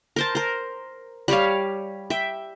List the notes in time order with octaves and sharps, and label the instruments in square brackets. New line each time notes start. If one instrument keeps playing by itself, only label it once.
[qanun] A#4 C5 A5
A#4 C5
G3 G4 C#5 F5
E5 G5